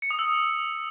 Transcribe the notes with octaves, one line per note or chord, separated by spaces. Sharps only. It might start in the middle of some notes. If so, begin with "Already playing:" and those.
C#7
D#6
E6